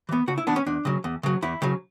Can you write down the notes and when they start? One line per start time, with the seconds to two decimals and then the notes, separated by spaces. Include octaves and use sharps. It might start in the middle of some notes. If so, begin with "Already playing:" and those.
0.09 E3 B3
0.27 C#3 F#4
0.38 E4
0.47 E3 B3 D4
0.56 C#4
0.66 E2 D4
0.85 C#3 F#3
1.04 E2
1.23 C#3 F#3
1.42 E2 E4
1.62 C#3 F#3